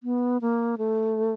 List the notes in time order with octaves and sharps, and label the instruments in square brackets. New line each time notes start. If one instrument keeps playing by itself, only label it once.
[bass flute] B3
A#3
A3